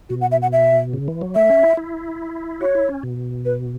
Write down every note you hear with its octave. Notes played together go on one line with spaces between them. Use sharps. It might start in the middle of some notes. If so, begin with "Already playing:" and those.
B2 F#4
F#5
E5
F#5
E5
C#3
E3
F#3
A3 E5
C#4
E4
E4
F#4 C#5
E4
C#4
B2
B4